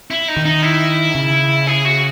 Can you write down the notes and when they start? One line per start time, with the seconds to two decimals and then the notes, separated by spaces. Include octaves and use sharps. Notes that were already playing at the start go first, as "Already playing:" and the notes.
0.10 E4
0.28 D#4
0.37 D#3
0.45 D#4
0.63 E4
1.15 C#3
1.67 G#4
1.85 F#4